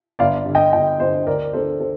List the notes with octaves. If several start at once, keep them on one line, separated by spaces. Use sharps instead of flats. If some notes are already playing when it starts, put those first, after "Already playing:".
G1 D5 F5
G2 D3
D#5 G5
G1 D#5 G5
G2 D3 C5 D#5
D2 A#4 D5
D3 A3 A4 C5
A4 C5